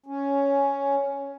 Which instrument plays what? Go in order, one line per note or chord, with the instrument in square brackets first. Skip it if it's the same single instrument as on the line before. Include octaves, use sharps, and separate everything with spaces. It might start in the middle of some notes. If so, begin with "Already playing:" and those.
[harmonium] C#4